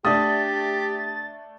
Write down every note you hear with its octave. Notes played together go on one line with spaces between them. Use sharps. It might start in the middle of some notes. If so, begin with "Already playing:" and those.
A3 D4 G4 D#6 A6